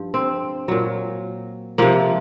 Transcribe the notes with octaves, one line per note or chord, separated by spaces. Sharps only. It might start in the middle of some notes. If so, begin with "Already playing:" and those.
Already playing: G2 F3
C4
A#2 F#3
C3 F3 A#3